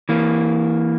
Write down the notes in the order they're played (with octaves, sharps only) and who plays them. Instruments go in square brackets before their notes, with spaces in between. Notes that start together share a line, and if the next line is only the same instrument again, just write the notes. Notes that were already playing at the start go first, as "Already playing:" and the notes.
[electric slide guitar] E3 A#3